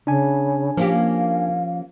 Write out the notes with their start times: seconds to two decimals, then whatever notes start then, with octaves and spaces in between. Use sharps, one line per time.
0.07 C#3 D4 G#5
0.77 F3 A#3 C#4 G4 F5